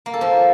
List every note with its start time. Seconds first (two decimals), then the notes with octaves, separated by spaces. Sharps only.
0.06 A#3
0.14 A4
0.21 F3